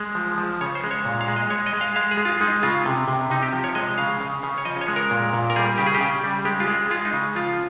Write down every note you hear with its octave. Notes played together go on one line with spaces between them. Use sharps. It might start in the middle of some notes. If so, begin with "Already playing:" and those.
Already playing: G#3
F3
F3
C#3 C#5
C5
G#3
C#5
A#2
F5
G#3
D#5
G#3 C#5
D#5
G#3
F5
G#3 F5
G#4
G#3
F4
G#3 D#4
C#3 F4
C3
C3
C3 D#4
G4
F3
C#5
G#3 D#5
C#3 F5
C#3
C#3
C#5
F3 D#5
C#5
G#3
A#4
A#2
A#2
A#4
G3 G#4
C#3 G4
G#4
G4
C#3
G3
G#3 G4
F4
G#3
G#3 F4
D#4
C#3
F3 F4